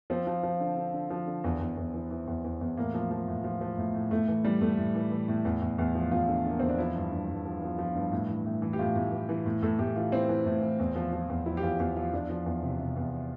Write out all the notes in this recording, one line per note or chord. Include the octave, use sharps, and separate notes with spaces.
F3 C4
F3
F3
D3
D3
D3
F3
D3
E2
E2
E2
E3
E3
E2
E2
E2
A2 A#3
F3
F3
A2
F3
F3
A2
A2
A2 A3
E3
E3 G3
A2 A3
A2
E3
E3
A2
E2
E2
E2
F3
E2 F4
D3
D3 A#3
E2 C4
D4
F3 E4
G2
G2
G2
F3
F3
F3
G2
A2
E3
A2
E3
G4
A2 F4
A2
E3
E3
A2
A2 A4
A2 G4
E3 F4
E3 C4
E3
A2
E3
E2
F3
F3
E2
F3 E4
G4
E2 F4
E2 G4
F3 F4
E2 D4
F3
E2
C3
C3
E2